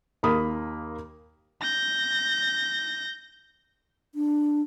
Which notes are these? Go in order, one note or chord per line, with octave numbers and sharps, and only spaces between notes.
D#2 A#3 B5 D#6
G6 A#6
D4